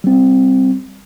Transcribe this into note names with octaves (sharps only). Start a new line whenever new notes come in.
G3 C4